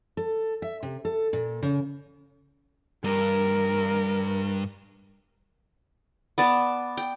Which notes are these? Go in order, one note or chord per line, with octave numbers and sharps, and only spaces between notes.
A4
E5
C3
A4
A#2
C#3
G2 A#4
B3 D5 A5
G5